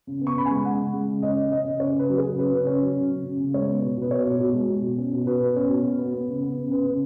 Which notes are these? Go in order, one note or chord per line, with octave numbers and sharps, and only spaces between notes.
C#3
B3
C#6
C#3 B5
G#5
G#3
C#3 F#5
C#3
G#3
C#3
C#4 D#5
C#4
C#3 D#5
C#3
C#4 C#5
C#3
B4
F#3
G#4
C#3
C#4 B4
C#3
C#4
F#3
C#3
C#3
C#3
C#3
G#3 C#5
B3
B2
B2 B4
B3 C#5
B2
B2
G#3
B2
B2
C#4
B2
B2 B4
B2
C#4
B2
B3
B3
B3
C#3
B3
C#3
C#3 B4
C#3